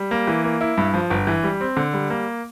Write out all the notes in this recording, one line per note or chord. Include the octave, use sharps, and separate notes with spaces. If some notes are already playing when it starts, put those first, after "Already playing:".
Already playing: G3
A#3
E3
A#3
E4
G2
F3
G1
E3
G3
C4
D3
G3
A#3